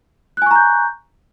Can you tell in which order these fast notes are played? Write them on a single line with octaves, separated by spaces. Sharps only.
F#6 G#5 C#6 A#5 G6